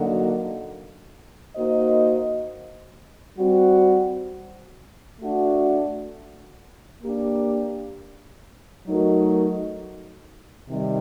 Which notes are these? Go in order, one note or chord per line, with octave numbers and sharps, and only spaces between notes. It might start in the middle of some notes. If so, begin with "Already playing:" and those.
Already playing: D3 F#3 A#3 D#4 F#4
A#3 D#4 F#4 C5 D#5
G3 C4 F#4
A3 D4 F#4
A#3 D4 G4
F#3 A3 D#4 F#4 A#4
C3 D#3 G3